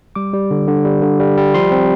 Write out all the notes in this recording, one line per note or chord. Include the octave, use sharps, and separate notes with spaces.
G3 D6
G3
D3
D3
G3
D3
G3
G3
F3 C6
C4